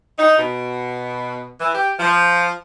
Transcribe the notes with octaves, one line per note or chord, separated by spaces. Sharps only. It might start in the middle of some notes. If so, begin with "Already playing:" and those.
D#4
B2
E3
G4
F3